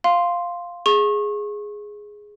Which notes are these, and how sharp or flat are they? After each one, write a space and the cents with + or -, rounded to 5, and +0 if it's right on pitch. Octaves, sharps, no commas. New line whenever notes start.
F5 +0 C6 +0
G#4 +0 C#6 -30